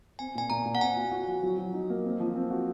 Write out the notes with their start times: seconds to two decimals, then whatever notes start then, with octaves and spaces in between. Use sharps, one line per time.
0.19 C4 G#5
0.35 A#2 G#5
0.50 A#2 A#5
0.66 A#2
0.75 F#5
0.81 C4 G#5
0.97 F#4
1.12 F#4
1.27 F3
1.43 F#3
1.58 F#3
1.74 D#4
1.90 A#3
2.05 C4
2.20 F3
2.35 C4
2.51 F#4